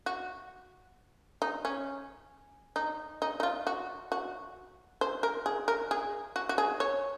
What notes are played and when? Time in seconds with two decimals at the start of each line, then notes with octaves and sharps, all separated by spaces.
0.06 F#4
1.42 D#4
1.65 C#4
2.76 D#4
3.22 D#4
3.40 D#4
3.43 F4
3.67 F#4
4.12 F#4
5.01 C5
5.23 A#4
5.46 G#4
5.68 A#4
5.91 G#4
6.36 F#4
6.49 F#4
6.58 G#4
6.80 C#5